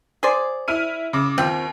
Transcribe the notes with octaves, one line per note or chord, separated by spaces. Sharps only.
G#4 C5 D5
E4 F6 D#7
C#3 D6
D#2 C4 F4